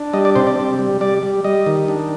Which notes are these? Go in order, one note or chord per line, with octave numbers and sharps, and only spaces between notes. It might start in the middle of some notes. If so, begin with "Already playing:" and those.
Already playing: D4
G3 D#5
D5
C3 C5
D5
G3
G3
G3 D5
G3
G3 D#5
D#3
D4